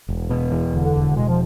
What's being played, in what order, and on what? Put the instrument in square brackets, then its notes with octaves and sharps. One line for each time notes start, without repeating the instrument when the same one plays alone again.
[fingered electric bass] E1
B2
E2
[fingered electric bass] E1 [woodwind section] D3
[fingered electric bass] E1
[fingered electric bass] B2 [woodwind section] G#3
[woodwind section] F3